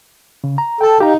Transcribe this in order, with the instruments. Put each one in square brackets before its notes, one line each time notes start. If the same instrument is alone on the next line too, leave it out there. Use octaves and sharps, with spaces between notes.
[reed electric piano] C#3
A#5
[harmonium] A4 [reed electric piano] G5 A5
[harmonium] D#4 [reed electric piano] G4 F5 A#5